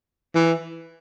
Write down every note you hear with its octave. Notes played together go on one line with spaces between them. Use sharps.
E3